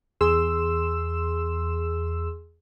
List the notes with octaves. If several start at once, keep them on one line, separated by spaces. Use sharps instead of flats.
E2 G#4 C6 E6 E7